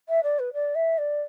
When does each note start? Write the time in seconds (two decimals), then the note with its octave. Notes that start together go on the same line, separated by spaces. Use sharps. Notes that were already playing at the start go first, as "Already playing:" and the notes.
0.09 E5
0.23 D5
0.39 B4
0.53 D5
0.75 E5
0.98 D5